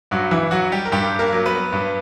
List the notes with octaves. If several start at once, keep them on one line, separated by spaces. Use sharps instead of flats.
G2 F#3 F#4
E3 E4
F#3 F#4
G3 G4
A#4
G2 G3 G4
A#3 A#4
F#3
B3 B4
G2